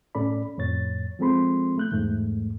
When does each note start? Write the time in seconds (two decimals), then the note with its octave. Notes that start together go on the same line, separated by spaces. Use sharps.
0.15 A2 C#4 A4 D5 B5
0.58 F2 A2 C#5 A6
1.19 F3 G#3 C4 A4 B5 C6
1.78 A3 F#6 G6
1.92 E2 G#2 A3